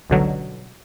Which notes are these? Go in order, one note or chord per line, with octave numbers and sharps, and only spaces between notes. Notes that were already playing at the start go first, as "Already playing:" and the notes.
G1 C#2 B2 D3 F#3